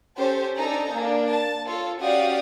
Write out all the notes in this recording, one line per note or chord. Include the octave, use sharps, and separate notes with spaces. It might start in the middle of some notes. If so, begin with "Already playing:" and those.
C#4 G4 A4 C5
D4 D#4 A4 G#5 A#5
A#3 D4
A5
F4 A4 C#5
C#4 F#4 G4 D5 F5 D#6